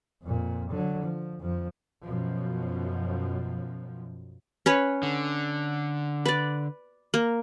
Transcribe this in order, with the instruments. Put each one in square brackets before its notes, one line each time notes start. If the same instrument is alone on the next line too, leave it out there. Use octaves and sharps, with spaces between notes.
[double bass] F2 A#2
D3 F#3
F3
F2 F3
[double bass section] F#2 B2 F3
[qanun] C#4 B4 C#5
[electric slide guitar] D3
[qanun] B4 D5
A#3